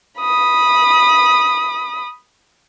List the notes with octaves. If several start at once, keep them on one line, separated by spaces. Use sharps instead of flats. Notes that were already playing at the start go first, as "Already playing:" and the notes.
B5 D#6